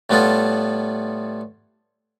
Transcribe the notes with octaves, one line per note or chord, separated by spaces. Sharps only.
A2 G3 B3 E4 F4 A4